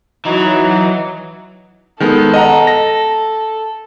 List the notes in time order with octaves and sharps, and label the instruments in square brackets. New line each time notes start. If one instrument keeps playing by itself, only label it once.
[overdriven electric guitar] E3 [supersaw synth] F#3 [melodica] D#4
[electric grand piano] D#3 G#3 B3 [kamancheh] A4
[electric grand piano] D#5 F#5 A#5
A#6